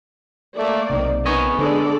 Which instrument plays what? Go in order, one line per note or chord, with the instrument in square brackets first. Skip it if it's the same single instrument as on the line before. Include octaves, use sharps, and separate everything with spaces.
[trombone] A3 [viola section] A#3 D5
[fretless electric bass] B1 C3 [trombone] D#3
[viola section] D#3 [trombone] B3 [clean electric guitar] C#4 C#5 D#5
[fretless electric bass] D3 [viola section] G#3 A4 D5